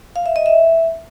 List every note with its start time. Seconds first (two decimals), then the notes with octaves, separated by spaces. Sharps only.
0.16 F5
0.26 E5
0.36 D#5
0.46 E5